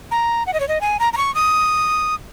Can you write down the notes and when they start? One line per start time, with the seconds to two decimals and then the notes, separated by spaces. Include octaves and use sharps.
0.11 A#5
0.47 F#5
0.53 D#5
0.60 C#5
0.68 D#5
0.81 G#5
0.99 A#5
1.13 A#5
1.17 C#6
1.35 D#6